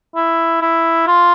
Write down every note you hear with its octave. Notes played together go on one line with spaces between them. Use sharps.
E4
E4
F4